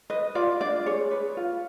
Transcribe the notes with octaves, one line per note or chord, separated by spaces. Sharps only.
B4 D#5
F4 D5
D4 D5
G#4 C#5
B4
F4